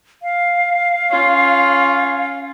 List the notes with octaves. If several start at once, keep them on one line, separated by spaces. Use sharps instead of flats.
F5
C#4 F4